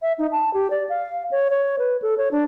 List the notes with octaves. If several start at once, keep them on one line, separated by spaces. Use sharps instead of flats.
E5
D#4
A5
G4
D5
F5
C#5
C#5
B4
A4
C#5
D4